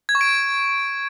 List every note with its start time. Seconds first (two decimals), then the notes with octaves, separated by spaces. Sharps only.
0.09 G#6
0.15 C#6
0.21 D7